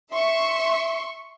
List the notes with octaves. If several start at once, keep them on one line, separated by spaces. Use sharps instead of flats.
E5 C6 C#6